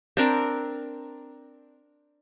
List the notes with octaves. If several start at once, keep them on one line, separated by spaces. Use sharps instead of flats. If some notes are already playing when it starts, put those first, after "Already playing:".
C4 D4 A#4